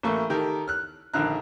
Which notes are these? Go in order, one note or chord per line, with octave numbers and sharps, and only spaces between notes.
A1 A3 A#3 C#6
D#3 G4 A4 A#4
F6 F#6
A#1 D3 D#3 F5 A#5 F#6